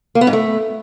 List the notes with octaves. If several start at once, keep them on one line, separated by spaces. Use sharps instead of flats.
A#3
B3
G#2
A3